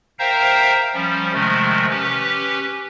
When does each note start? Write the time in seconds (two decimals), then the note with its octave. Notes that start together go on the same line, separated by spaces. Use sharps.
0.19 A#4 C5 E5 F5 G5 A#5
0.94 F3 G3 C#4
1.33 C3 D#3 F3 G#3 A3
1.90 C#4 G4 B4